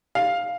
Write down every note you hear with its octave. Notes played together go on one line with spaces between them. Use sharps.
F5